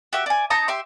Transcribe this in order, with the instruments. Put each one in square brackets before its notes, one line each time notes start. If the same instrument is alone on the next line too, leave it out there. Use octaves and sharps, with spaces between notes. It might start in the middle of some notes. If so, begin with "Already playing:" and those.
[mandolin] F#4 G4 E5
D5 G#5
D#4 A5 A#5 D#6
G4 E5 C6